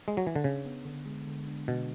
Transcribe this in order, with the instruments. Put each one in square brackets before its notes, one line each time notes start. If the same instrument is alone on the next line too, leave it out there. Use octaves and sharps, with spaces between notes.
[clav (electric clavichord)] G#3
F#3
E3
D3
[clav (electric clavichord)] C#3 [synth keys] D4
[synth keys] B3
D3
G#3
D3
D4
[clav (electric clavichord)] B2 [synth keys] D4